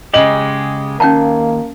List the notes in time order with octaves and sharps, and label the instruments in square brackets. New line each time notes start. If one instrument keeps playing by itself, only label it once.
[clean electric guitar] C#3 G#3 G4 [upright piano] D#5 F#7
[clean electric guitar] D#2 [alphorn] A#3 [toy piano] C#4 G5 A5